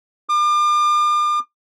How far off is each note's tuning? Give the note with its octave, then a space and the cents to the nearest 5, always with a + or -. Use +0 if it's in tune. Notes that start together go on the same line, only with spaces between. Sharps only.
D6 +40